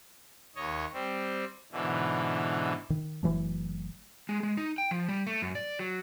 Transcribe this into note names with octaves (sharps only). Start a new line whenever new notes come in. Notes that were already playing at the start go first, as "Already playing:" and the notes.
D#2 C#5 D#5
G3 C4
G#2 B2 D3 E3
D#3
F#1 E3 F#3 A3
G#3
G#3
D#4
G5
F3
G3
A3
F#2
D5
F#3